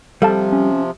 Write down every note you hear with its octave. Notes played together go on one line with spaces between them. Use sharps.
C3 F3 G3 A4 F5 A5
C#4